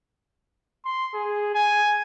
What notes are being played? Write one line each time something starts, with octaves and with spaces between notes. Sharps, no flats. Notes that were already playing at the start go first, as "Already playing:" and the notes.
C6
G#4
G#5